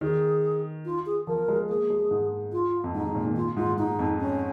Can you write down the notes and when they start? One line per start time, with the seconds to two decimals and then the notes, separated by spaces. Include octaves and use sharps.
0.01 D#3 G#4
0.85 F4
1.06 G#4
1.27 F3 A#4
1.48 G#3
1.69 A#3 G#4
1.90 G#3
2.11 G#2
2.52 F4
2.84 F2
2.95 G#2 D#4
3.05 G#2
3.15 A#2
3.26 D#3
3.36 F4
3.57 G#2 F4
3.77 G#2 D#4
3.99 F2
4.20 C#4